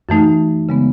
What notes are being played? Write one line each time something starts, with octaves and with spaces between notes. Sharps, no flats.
F#2 E3 A3 D#4
C#3 G#3 B3